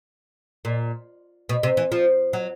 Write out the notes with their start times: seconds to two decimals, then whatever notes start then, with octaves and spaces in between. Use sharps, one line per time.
0.65 A#2
1.49 B2
1.63 C3
1.77 E3
1.92 F3
2.33 F#3